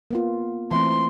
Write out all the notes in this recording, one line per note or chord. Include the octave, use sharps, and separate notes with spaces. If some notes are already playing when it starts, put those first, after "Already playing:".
A#3 B3 F4
E3 A3 C4 C6